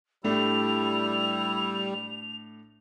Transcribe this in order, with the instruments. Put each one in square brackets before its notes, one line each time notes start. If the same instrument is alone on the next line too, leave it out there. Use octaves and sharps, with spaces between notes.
[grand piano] A2 A3 D4 [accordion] G3 [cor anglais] E4 [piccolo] F7